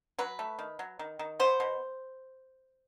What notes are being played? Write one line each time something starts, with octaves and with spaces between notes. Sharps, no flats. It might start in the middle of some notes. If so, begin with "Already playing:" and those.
F#3 B4
A3
D#3
F#3
D#3
D#3
B3 C5
B2